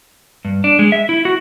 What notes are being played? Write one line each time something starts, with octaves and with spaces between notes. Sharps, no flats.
G2
D4
G#3
E5
E4
F#4